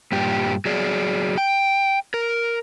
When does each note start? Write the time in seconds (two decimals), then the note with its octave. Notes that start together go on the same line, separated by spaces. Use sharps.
0.12 G2 A#2 G4
0.65 F#3 G#4 D5
1.38 G5
2.14 A#4